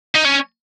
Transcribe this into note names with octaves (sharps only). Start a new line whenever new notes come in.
D#4
C#4